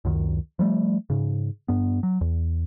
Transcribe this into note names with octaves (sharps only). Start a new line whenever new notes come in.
C#2 F#2 D#3
F3 G3 A3
G#2 C#3
G2 B3
F#3
E2